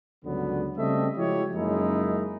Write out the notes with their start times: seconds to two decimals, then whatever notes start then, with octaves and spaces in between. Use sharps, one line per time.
0.25 C#2 G2 D3 F#3 B3
0.77 C#3 G3 A3 C4 D#5 E5
1.17 F3 G#3 E4 F#4 G4 C#5
1.54 F#2 C#3 G#3 A#3 D#4 E4